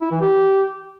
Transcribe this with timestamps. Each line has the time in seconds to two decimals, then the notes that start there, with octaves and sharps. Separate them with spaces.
0.02 E4
0.11 E3
0.21 G4